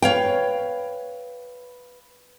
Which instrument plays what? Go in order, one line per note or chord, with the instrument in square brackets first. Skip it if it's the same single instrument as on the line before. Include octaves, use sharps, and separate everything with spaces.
[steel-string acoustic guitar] B4 [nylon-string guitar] C#5 F5 G5